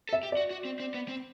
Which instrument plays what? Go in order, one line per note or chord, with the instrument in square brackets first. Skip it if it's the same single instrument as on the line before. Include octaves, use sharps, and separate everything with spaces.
[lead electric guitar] A4
[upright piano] E5
[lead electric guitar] G4
[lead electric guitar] F#4 [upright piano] D5
[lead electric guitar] F#4
C4
C4
B3
C4